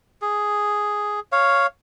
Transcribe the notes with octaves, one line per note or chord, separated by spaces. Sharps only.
G#4
C#5 F5